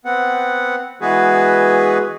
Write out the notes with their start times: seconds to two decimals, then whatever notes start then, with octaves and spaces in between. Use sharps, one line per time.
0.05 B3 C4 F#5
1.01 E3 G#3 B3 F#4 G#4 B4